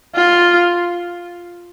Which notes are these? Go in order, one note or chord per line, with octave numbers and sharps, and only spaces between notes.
F4